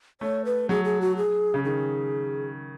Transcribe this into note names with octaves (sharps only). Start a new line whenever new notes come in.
A3 C#5
B4
F#3 G#4
G#4
F#4
G#4
C#3
D#3 G#4